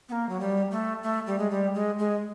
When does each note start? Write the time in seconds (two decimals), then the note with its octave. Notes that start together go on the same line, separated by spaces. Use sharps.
0.09 B3
0.12 A#3
0.29 F#3
0.40 G3
0.71 A3
1.03 A3
1.27 G3
1.38 G#3
1.50 G3
1.74 G#3
1.99 G#3